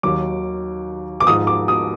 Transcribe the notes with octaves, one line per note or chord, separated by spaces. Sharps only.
D#2 D#3 F#3 D6
D6
G#2 F3 D#6
D6
D#6